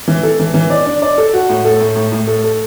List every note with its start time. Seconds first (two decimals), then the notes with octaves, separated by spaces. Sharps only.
0.08 E3
0.23 A4
0.39 E3
0.54 E3
0.70 D5
0.85 D4
1.02 D5
1.18 A4
1.34 F#4
1.49 A2
1.65 A4
1.80 A2
1.96 A2
2.12 A2
2.27 A4
2.44 A4